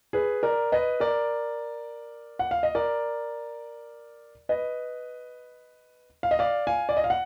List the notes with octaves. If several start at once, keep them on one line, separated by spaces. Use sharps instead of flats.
G#4 B4
A#4 D5
B4 D#5
A#4 D5
F#5
F5
D#5
A#4 D5
B4 D#5
F5
D#5
D5 F5
F5 G#5
D5
D#5
F5
F#5